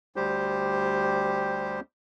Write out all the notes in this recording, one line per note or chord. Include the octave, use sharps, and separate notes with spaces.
D2 G3 G4 C5